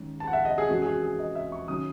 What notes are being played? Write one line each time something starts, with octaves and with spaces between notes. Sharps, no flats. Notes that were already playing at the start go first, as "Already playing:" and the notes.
Already playing: D#3 G#3 C#4
A5
F#5
E5
D#5
G#4
E3 G#3 C#4 F#4
G#4
F#4
G#4
D#5
E5
C#6
D#3 F#3 C#4 D#6